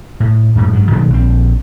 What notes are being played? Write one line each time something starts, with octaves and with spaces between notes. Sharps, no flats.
A2
F#2 A2
G#2 F#3
B2 D#3 F#3 A#3
A#1 C4